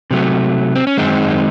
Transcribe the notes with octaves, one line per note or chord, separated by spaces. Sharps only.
C3 F#3 A3
C4
C#4
F#2 D#3 G#3 C4 D#4